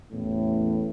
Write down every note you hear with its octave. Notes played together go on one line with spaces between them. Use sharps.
A1 E2 A2